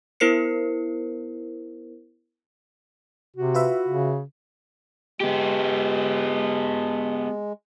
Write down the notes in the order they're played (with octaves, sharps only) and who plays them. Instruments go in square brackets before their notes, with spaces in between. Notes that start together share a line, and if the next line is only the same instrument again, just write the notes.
[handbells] B3 E4 A#4 C5 C7 C#7
[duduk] C3 [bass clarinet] F#4
[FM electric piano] F4 B4 E5
[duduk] C#3
[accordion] G#3 [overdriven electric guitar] B3 G4